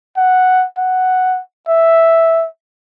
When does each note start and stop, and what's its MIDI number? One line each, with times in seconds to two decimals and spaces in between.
0.17 0.65 78
0.77 1.40 78
1.68 2.46 76